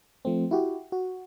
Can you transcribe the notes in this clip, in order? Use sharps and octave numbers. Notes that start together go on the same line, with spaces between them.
F3 A3 C4
E4 F#4 G4
F#4